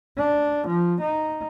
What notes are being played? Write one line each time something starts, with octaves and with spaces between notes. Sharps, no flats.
D4
F3
D#4